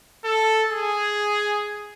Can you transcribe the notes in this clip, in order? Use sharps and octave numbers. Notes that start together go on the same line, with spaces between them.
A4
G#4